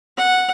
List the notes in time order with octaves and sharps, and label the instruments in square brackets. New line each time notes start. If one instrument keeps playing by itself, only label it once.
[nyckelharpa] F#5